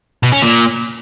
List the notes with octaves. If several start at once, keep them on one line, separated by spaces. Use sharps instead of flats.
B2
C#4
A#2